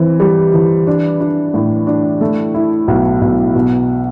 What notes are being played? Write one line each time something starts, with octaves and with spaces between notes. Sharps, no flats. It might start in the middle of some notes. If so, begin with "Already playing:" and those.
Already playing: E3 C4
G3
E3
D4
D4
A2
D4
A3
E4
B1
B1
B2